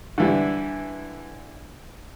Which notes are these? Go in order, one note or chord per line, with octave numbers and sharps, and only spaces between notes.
D3 E3 G3